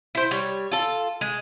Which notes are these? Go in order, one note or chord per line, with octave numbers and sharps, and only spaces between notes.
E4 C5
G3 C#5
F4 A4
G#3